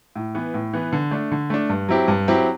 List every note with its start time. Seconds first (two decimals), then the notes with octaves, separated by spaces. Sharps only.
0.16 A2
0.35 E3 B3
0.54 A2
0.73 E3 B3
0.93 D3
1.11 A3 D4
1.32 D3
1.50 A3 D4
1.69 G2
1.89 F#3 C4 E4 G4
2.08 G2
2.28 F#3 C4 E4 G4